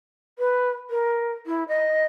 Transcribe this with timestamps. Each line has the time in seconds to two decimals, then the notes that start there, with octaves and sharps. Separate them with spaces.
0.39 B4
0.90 A#4
1.46 E4
1.68 D#5